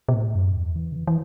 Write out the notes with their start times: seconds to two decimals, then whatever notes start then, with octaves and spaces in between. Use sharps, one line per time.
0.09 B2
0.14 A2
0.35 F#2
0.55 E2
0.76 E3
0.92 C#3
0.96 E3
1.07 E3